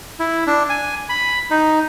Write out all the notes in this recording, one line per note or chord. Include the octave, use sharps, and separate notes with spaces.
E4
D4
G#5
B5
D#4